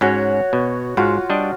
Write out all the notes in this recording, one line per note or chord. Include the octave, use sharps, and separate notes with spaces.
G#2 C#4 F#4 C#5
B2
G#2 F4 F#4
G3 D4 D#5